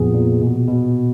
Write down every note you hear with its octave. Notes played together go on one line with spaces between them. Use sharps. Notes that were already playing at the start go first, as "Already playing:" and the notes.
Already playing: F2 A#2 B3 G#4
A#2
B2
B2